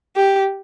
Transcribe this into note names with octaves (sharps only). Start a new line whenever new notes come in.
G4